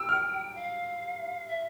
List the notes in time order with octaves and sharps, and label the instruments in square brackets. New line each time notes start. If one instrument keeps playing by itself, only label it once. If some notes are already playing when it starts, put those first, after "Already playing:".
Already playing: [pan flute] G5 [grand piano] E6
[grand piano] F6
[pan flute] F5
E5